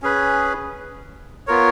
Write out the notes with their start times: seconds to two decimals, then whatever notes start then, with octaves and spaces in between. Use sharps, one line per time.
0.02 C#4 G#4 B4
1.47 B3 F4 A#4 C#5